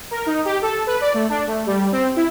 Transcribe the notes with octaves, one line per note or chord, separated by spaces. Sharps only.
A#4
D#4
G4
A4
B4
D5
A3
D4
A3
G3
C4
E4